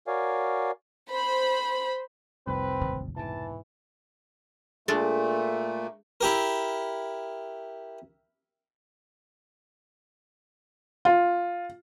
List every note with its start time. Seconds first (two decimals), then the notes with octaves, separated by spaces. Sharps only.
0.07 F#4 A#4 C#5 D5 F5 G#5
1.10 C5 B5
2.47 F1 C2 C4 B4
2.81 D1 G#1 D#2
3.17 G#2 B2 E3 A5
4.88 A#2 G#3 A3 D4 A4
6.21 E4 G4 A#4
11.05 F4